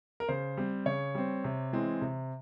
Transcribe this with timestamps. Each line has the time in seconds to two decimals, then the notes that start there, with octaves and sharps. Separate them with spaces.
0.20 A#4
0.29 C#3 C5
0.57 G3 C4
0.86 C#3 C#5
1.15 G3 C4
1.44 C3
1.73 E3 G#3 C4
2.02 C3